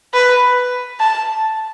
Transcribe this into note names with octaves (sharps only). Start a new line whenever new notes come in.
B4
A5